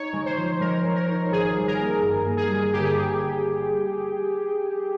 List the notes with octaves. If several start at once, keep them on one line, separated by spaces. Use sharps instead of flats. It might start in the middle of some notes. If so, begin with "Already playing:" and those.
Already playing: D#4 C#5
G#3
C5
F3
G#3 A#4
G#3
A#4
D#4
G#1 G#4
G3
A#4
A#3
G2
A#3
G#4
G3
G1 G4
G#4